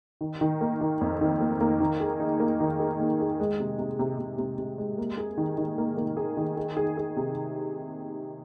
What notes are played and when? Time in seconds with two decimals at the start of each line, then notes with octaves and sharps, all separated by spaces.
0.21 D#3
0.41 D#3
0.61 A#3
0.81 D#3
1.01 F2
1.21 D#3
1.40 A#3
1.61 A#3
1.80 D#3
2.00 G#4
2.20 D#4
2.40 A#3
2.60 D#3
2.80 G#4
3.00 A#3
3.20 G#4
3.40 G#3
3.60 C3
3.78 C3
3.99 C3
4.19 C3
4.38 C3
4.58 C3
4.78 G#3
4.98 A#3
5.17 G#4
5.38 D#3
5.58 D#3
5.78 A#3
5.97 A#3
6.17 G#4
6.37 D#3
6.57 G#4
6.77 G#4
6.97 G#4
7.16 C3